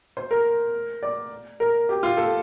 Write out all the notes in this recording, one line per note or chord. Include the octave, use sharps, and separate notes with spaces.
C5
A#4
D5
A#4
G4
F4
A4